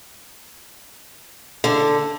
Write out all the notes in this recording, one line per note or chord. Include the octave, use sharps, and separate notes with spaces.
D3